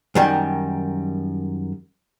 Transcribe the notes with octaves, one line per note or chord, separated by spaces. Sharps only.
F#2 D#3 G3